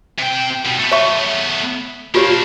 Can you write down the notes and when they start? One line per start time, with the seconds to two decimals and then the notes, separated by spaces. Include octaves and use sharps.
0.19 C3 G5
0.65 B2 G3
0.79 A3 B3
0.92 C#5 E5 C#6
2.15 A#3 D4 F4 G4 C#5